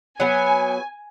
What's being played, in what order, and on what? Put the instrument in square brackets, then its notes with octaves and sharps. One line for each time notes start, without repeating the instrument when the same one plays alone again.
[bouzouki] F#3 B3 [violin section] G#5